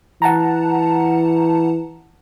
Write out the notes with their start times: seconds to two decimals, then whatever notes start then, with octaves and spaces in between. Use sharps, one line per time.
0.22 E3 F#5 A5 A#5